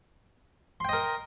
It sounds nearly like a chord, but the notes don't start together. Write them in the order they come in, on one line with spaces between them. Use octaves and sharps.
C6 G5 D#5 A#4